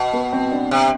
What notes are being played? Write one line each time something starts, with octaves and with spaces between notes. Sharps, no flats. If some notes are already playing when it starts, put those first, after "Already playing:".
Already playing: B2
B3
C4
D4
C3